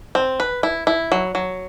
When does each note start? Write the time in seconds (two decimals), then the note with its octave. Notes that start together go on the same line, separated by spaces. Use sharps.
0.15 C4
0.40 B4
0.63 E4
0.87 E4
1.12 F#3
1.35 F#3